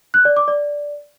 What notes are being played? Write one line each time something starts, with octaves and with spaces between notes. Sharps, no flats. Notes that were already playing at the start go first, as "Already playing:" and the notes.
F#6
D5
D6
D5